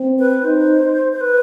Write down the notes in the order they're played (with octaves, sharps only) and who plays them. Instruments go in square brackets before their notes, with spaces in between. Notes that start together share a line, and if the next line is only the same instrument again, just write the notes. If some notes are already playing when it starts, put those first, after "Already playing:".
Already playing: [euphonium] C4
[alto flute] B4
[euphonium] D#4 [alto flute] C5
[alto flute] C5
B4